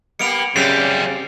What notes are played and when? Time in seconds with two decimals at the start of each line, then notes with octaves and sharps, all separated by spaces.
0.19 G3 A#3 B3 C#7 D7 F7
0.56 F#2 C#3 G3 C4 G4 C7 F7